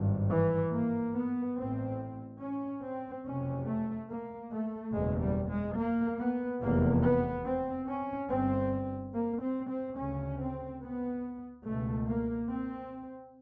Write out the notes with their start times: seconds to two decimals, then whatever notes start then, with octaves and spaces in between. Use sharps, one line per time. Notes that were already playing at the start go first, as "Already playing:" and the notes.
Already playing: G#1 G2
0.30 E3
0.73 A#3
1.14 B3
1.57 A1 A2 C4
2.40 C#4
2.83 C4
3.24 F#1 F2 C3 C#4
3.66 A3
4.08 A#3
4.50 A3
4.93 F#1 E2 B2 G#3
5.21 G3
5.49 G#3
5.77 A#3
6.19 B3
6.61 F1 E2 C3 A#3
7.02 B3
7.45 C4
7.86 C#4
8.29 G1 G2 C4
9.13 A#3
9.41 C4
9.69 C4
9.96 D2 C#3 C#4
10.39 C4
10.81 B3
11.65 C#2 B2 A3
12.07 A#3
12.49 C4